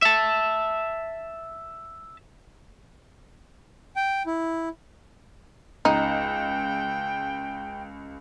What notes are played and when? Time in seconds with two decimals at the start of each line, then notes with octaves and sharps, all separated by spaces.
0.02 E5 A5
3.96 G5
4.26 E4
5.85 C#2 D#4 G5